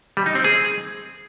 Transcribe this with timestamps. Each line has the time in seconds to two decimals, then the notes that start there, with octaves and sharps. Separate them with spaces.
0.17 G3
0.26 D#4
0.35 C4
0.44 G#4